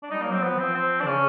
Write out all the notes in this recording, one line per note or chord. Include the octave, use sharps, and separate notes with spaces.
D4
G3 D#4
A#3
F#3 C4
F3 B3
E3
F3 C4
C4
D4
C#3 C#4